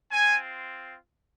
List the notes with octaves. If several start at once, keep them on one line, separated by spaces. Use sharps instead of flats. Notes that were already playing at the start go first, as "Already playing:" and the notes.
C4 F4 G#5